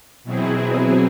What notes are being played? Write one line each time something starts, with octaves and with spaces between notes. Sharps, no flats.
B2 E3 F#3 C4 E4 G#4